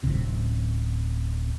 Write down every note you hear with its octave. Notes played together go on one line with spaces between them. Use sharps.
D1 C3